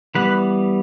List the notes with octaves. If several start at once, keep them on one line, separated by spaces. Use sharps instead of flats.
E3 G3 B3 B4